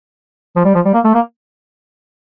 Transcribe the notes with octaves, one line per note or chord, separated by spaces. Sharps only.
F3
G3
F3
G3
A#3
A3
A#3